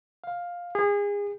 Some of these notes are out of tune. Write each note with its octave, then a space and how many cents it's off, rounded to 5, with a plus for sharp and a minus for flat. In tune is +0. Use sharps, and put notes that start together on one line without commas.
F5 +10
G#4 -30